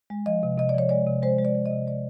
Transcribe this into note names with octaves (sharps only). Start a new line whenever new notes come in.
G#3
F3 D#5
C3
C3 D#5
D5
F3 C#5
G#3 D5
C3
G#3 C5
G#3
D5
G#3
D#5
C3
G#3 D5